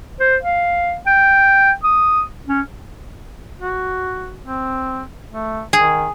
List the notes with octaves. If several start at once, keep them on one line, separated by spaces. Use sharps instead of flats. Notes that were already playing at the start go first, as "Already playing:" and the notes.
C5
F5
G5
D#6
C#4
F#4
C4
A3
D#3 G#4